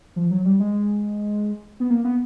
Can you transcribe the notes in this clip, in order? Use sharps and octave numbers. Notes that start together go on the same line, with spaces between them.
F3
F#3
G3
G#3
B3
A#3
B3